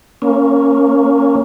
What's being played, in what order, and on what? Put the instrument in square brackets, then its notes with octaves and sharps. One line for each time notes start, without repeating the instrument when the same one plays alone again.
[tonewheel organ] A#3 C#4